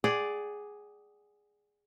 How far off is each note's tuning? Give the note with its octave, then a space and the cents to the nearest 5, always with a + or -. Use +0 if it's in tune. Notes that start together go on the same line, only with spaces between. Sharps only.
G#4 +0 D5 +0 F#5 +45